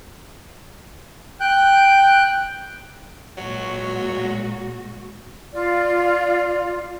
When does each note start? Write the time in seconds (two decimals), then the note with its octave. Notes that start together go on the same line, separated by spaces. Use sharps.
1.40 G5 F#6 G6
3.38 A#2 F#3 G#3 F#4
5.52 F4 D5